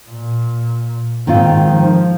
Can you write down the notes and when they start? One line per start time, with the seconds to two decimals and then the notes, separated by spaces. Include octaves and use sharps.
0.09 A#2
1.27 G#2 D#3 C4 F4
1.66 F3